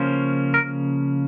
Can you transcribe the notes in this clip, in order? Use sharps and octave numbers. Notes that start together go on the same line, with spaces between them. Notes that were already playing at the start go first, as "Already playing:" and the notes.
Already playing: C#3 F3 A#3 C#4 C5
A#4